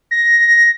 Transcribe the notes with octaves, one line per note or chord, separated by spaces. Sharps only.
A#6